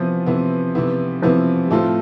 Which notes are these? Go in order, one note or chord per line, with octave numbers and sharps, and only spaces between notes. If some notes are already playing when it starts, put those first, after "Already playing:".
Already playing: C3 E3 F3 B3 E4
C3 E3 B3 E4
C3 E3 B3 E4
C3 E3 F3 B3 E4
G3
A2 F3 A3 C4 F4